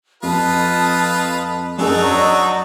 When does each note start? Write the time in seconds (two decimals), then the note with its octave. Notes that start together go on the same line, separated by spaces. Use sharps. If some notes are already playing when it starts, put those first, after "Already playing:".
0.23 F2 F4 B4 A5 D#6
1.78 F#2 D4 D#4 F#4 G#4 A#4 D#5 E6
2.02 F#3 D5 D#5 C#6 E6